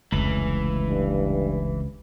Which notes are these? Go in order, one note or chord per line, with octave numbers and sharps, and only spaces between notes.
F1 C#2 E3 A3
G2